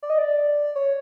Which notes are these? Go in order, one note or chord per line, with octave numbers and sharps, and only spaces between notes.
D5
D#5
D5
C#5